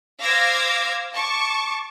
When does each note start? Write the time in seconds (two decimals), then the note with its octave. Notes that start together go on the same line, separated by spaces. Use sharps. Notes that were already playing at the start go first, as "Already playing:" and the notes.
0.20 C5 F5 D6 E6 G#6 A#6
1.14 A5 C#6 D6